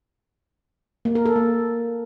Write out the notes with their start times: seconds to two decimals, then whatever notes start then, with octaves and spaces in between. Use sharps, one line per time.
1.05 A#3
1.15 A#4
1.25 A4
1.36 A#3